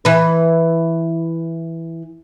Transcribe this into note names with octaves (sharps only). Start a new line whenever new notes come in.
E3 B4